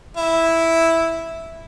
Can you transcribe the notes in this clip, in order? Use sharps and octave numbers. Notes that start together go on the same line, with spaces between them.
E4